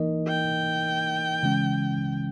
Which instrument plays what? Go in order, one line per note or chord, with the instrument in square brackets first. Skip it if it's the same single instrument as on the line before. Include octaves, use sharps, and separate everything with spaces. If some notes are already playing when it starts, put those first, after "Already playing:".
Already playing: [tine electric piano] E3 A#3 D#4 A#4 D#5
[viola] G5
[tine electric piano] C#3 E3 G#3 C#4